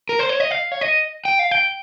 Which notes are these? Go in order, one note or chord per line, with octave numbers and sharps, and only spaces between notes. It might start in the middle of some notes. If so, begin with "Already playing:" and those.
A#4
C5
C#5
D#5
F5
C#5
D#5
G5
F5
G5